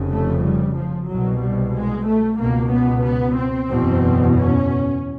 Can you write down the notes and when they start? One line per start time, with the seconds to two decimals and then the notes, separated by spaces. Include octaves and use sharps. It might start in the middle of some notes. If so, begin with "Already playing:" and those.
Already playing: F1 F2 C#3
0.11 A3
0.43 G3
0.76 F3
1.08 C2 B2 F#3
1.41 G3
1.74 G#3
2.07 A3
2.39 C#2 B2 A#3
2.71 B3
3.04 B3
3.38 C4
3.70 F#1 E2 B2
4.36 C#4